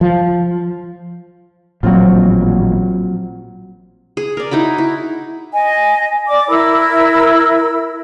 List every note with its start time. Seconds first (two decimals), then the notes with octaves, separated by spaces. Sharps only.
0.01 F3
1.83 A1 A#2 F3 F#3 C4 F4
4.17 G#4
4.37 A#4 D5
4.51 D#4 E4 F#4 B5
4.78 E4
5.52 D#5 G#5
6.28 D5 D6
6.49 E4 A#4 B5 E6